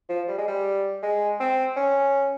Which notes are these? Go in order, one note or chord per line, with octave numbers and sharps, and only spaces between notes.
F3
G3
G#3
G3
G#3
C4
C#4